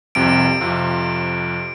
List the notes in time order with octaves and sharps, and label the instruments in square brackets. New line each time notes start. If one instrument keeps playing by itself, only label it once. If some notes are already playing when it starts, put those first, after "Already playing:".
[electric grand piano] C2 F2 C3 [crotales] D7
[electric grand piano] F2 C3 F4